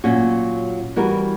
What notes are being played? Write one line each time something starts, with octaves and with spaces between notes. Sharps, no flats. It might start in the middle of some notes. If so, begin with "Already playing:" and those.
A#2 F#3 C#4 F#4
E3 G3 B3 F#4 A#4